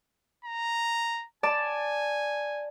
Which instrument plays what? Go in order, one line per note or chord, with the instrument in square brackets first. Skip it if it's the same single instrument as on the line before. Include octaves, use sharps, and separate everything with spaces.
[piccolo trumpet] A#5
[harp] D5 A5 [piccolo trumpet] G#5